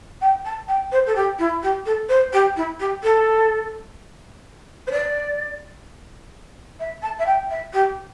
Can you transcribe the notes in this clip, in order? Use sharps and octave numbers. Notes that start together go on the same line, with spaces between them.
G5
A5
G5
C5
A4
G4
E4
G4
A4
C5
G4
E4
G4
A4
C5
D5
E5
A5
E5
G5
E5
G4